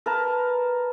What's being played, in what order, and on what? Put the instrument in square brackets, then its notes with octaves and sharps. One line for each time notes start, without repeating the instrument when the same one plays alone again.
[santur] A#4 B4 A5